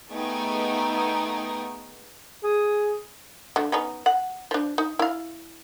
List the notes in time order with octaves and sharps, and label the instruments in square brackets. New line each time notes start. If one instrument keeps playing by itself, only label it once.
[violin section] A3 B3 D#4 G#4 G5 G#5
[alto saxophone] G#4
[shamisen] D3 A3
B3 C#4 D#4
F#5
F3 D4
D#4
E4 F5